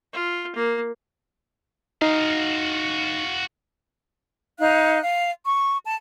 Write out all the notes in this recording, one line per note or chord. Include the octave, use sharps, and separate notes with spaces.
F4
A#3
D#4 F#4 F5
D#4 F5 F#6
F5
C#6
A5